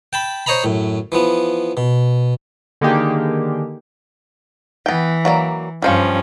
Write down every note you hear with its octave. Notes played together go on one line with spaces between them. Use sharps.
G5 A5 B5
C5 C#5 D#5 A#5 B5
F#2 A2
E3 F3 B3
B2
D3 D#3 A#3 D#4 G4 G#4
E3 B3 G5
F#3 A#3 D5
G2 F3 G3 C#4 C5 F5